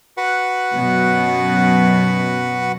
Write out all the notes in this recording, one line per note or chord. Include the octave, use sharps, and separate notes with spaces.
F#4 B4 F#5
F#2 B2